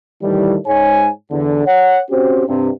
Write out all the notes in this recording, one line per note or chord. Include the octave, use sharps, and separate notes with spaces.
A2 D#3 E3 G3
G#2 C#5 G#5
E2 D3
C#5 F#5
C4 C#4 F#4 G4 C5
G2 C3